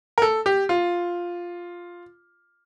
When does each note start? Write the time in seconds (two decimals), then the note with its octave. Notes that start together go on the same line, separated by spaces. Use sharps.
0.18 A#4
0.22 A4
0.46 G4
0.69 F4